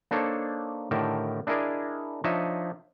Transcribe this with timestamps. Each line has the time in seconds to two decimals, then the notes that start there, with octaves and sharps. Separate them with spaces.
0.11 A#3 D4 D#4 A4 C5 C#5
0.91 A2 D3 D#3 G4 A#4 A5
1.47 D4 E4 G#4 A#4 D5 D#5
2.24 F3 D4 D#4 C#5 D#5 E5